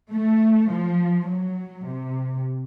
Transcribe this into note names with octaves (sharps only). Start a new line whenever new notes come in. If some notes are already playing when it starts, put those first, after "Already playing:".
A3
F3
F#3
C3